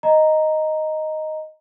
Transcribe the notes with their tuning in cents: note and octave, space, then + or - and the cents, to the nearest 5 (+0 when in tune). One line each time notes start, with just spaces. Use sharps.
D#5 +0 A#5 +0